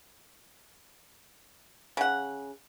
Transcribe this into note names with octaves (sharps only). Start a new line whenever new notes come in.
C#3 F#5